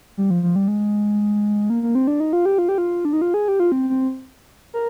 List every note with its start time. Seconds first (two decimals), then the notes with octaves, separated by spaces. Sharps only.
0.18 G3
0.30 F3
0.43 F3
0.56 G3
0.68 G#3
1.70 A#3
1.83 A#3
1.95 C4
2.07 D4
2.20 D#4
2.33 F4
2.45 G4
2.58 F4
2.69 G4
2.78 F4
3.05 D4
3.13 D#4
3.22 F4
3.34 G#4
3.48 G4
3.60 F4
3.72 C4
3.90 C4
4.74 A#4